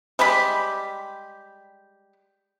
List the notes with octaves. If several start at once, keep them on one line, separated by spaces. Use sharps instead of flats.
G3 G#3 G4 B5